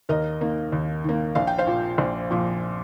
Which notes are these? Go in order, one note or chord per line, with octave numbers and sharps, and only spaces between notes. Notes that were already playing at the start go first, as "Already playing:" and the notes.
D#2 A#4 D#5
D#3 A#3
D#2
D#3 A#3
A#1 F5
G5
C5 F5
A#2 F3
A#1
A#2 F3